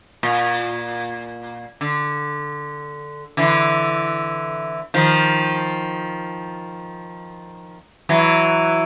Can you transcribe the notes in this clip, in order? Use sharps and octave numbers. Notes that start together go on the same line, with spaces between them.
A#2
D3
D3 E3
D#3 F3
E3 F#3